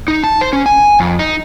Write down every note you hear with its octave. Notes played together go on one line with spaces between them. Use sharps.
D#4
A5
C5
C#4
G#5
F2
D#4